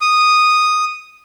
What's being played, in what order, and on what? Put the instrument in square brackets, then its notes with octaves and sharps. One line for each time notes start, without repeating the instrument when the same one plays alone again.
[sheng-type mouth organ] D#6